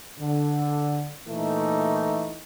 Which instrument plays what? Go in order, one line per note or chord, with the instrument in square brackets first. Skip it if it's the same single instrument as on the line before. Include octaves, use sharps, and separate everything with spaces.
[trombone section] D3
A#2 E3 A3 D#4